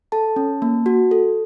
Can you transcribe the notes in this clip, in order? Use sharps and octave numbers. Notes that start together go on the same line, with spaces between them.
A4 A5
C#4
A#3
F#4
A4